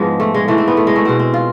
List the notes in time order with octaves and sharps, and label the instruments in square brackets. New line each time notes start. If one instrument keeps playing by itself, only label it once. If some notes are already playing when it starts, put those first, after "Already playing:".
Already playing: [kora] G#2 F3 G#3 B3
A3
G#3
G#2 E3 G#3 A3
C4
B3
A3
G#3
A3
B2 G#3 C4
C4
F4